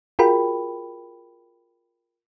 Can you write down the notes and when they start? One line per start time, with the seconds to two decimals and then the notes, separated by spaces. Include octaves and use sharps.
0.19 F4 F#4 G#4 A#4 G5 B5